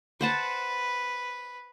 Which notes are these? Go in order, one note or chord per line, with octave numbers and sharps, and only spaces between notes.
B4 C5 F#5 A5